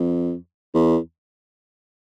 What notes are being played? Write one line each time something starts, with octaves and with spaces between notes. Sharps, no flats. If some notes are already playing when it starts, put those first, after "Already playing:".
Already playing: F2
E2